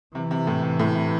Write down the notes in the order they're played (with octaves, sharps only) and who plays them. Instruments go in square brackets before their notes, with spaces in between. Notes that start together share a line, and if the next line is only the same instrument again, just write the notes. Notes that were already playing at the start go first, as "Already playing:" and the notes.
[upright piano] C3 [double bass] E3
[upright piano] C3
A2
C3
A2
C3